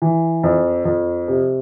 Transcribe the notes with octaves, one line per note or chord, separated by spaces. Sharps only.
E3
F2
F2
C3